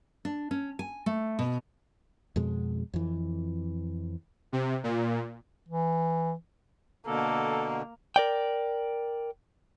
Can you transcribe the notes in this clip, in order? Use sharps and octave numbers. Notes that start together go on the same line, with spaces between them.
D4
C#4
G#5
A3
B2
F2 B2 G#3
F2 E3
C3
A#2
E3
B2 D3 A#3 A4
A#4 D5 G5